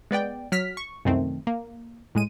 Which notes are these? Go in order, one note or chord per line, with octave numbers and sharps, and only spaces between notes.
G#3 B3 D5 G5
F#3 F6 B6
C#6
C2 F#2 D#3 A3 C4
A#3
A2 G#3 D#7